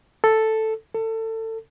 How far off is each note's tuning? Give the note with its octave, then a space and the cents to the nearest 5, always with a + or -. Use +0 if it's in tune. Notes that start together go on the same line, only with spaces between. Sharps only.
A4 +0
A4 +25